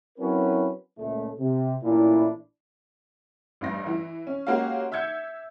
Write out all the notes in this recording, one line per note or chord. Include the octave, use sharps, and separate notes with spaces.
F#3 C4 C#4 E4 A#4 B4
C#2 A#2 C#3 A3
C3
A1 A#2 D4 E4
A1 G2 A#6
E3
C#4
G#3 A#3 C#4 F#4 G4 F5
E5 E6 G6 G#6 C#7